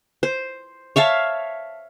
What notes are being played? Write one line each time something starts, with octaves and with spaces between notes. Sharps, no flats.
C5
C#5 E5 F5 A5